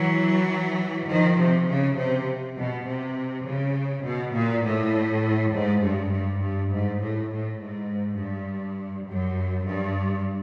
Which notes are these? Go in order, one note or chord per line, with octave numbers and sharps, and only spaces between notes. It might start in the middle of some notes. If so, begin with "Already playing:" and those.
Already playing: E3 F#3
D#3 F3
C3
C#3
C3
B2
C3
C#3
B2
A#2
A2
G#2
G2
G2
G2
G#2
A2
A2
G#2
G2
F#2
G2